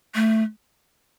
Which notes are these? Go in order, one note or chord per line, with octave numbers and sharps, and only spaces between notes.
A3